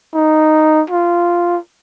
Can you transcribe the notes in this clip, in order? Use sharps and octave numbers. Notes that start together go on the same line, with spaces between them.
D#4
F4